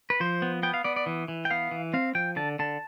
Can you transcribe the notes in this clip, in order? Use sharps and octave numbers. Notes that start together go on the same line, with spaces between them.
B4
F3 C5
B3
B3 G5
F5
B3 D5
D5
E3
E3
G5
B3 F5
E3
C4 F5
F3 G5
D3 A5
D3 A5